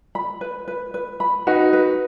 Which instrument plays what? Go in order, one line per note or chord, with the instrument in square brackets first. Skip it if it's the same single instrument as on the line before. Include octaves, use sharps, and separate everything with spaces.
[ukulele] B5
B4
B4
B4
B5
[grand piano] D#4 F#4 [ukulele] B4
[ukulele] B4